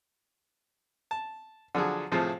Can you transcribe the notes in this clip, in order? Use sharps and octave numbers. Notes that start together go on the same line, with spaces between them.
A5
D3 F3 F#3 G#4
A2 C3 F3 F4 G#4 C5